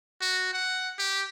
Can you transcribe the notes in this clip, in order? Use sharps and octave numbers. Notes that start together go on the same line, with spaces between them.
F#4
F#5
G4